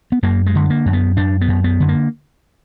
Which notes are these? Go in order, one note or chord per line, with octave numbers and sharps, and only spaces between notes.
B3
F#2 A#3
G#3
D3
A#3
F#2
B3
F#2 D4
B3
F#2
B3
D3
A#3